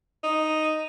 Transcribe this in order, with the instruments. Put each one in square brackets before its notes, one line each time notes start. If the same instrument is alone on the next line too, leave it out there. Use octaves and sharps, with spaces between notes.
[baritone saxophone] D#4